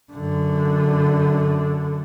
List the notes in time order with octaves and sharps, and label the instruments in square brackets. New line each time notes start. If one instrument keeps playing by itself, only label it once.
[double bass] F#2 D3